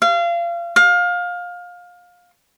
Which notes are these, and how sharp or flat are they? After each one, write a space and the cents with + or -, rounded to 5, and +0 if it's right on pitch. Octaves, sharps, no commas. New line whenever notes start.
F5 -30
F5 +25